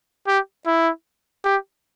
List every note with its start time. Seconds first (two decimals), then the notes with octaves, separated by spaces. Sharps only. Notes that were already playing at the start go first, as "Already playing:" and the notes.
0.27 G4
0.66 E4
1.44 G4